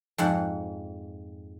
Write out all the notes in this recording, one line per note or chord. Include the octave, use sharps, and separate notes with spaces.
F2 G#2 F#5